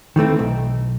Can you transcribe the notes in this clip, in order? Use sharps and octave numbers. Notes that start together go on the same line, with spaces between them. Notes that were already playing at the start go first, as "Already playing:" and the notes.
D#3 E3 A3 C4
B1